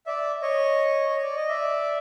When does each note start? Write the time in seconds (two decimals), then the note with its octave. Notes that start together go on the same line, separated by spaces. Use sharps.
0.06 D5 E5
0.42 C#5 D#5
1.09 C#5
1.22 D5
1.36 D#5
1.49 D5 E5